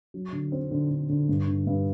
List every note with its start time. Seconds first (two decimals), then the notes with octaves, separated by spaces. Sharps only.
0.14 F#3
0.32 D3
0.52 C4
0.71 D3
0.90 D3
1.09 D3
1.29 G2
1.47 D3
1.67 G2